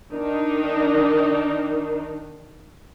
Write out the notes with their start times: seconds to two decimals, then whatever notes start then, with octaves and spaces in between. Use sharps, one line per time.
0.12 D#3 D4 D#4